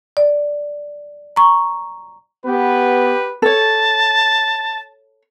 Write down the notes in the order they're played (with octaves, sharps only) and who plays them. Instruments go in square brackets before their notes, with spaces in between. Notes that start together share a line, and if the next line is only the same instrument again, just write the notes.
[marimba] D5
A#5 C#6
[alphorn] B3 [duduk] G4 [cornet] B4
[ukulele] A4 C#5 [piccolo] A5